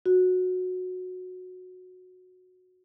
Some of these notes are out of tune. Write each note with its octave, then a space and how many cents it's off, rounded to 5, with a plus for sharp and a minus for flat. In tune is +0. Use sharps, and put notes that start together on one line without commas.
F#4 -15